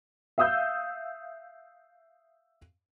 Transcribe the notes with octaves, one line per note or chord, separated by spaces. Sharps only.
E5 F5 D#6 E6 G6